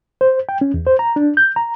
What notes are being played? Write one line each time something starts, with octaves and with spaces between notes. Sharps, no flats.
C5
G5
C#4
E2
C5
A#5
D4
G6
A#5